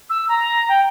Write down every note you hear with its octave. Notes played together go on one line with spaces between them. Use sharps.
E6
A#5
G5